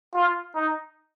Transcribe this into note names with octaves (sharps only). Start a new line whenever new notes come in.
F4
D#4